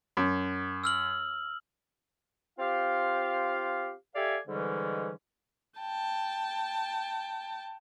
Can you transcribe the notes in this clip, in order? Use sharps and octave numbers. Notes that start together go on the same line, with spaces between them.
F#2
E6 F6 F#7
C4 F4 G4 F5
G4 A4 D5 E5 F5 G#5
G#2 D3 E3 G3 G#3 C#4
G5 A5